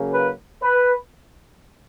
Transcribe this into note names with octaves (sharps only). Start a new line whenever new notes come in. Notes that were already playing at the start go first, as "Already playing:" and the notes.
Already playing: C#3 F#3 A#3
B4
B4